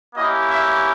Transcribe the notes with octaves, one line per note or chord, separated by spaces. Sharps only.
A#3 C#4 E4 G4 D#5
E5